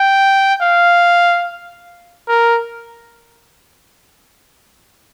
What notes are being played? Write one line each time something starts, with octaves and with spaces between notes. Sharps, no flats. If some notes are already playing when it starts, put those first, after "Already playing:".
Already playing: G5
F5
A#4